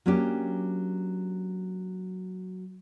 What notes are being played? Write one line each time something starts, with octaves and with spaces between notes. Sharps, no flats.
F#3 A#3 C#4 D4 G4